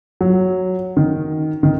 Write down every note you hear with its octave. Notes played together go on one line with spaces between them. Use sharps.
F#3
D#3
D#3